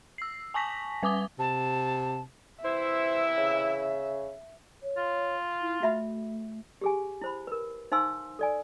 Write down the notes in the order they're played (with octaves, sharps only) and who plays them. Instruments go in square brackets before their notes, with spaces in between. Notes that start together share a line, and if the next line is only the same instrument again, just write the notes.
[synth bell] E6 C7
G#5 A5 C#6 A#6 B6
G3 B4 G#5 D6 D#6 G7
[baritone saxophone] C3 [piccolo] A5
[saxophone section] C3 E3 E4 [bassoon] C5 [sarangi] E5
[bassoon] C#3
[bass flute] C#5
[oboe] F4
[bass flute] E4
[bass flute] A3 [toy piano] F#4 E5 B5
[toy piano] G4 G#4 G#5
E4 C5 B5
A#4 B4
D#4 C5 F5 G#5 C6 E6
A4 D5 G#5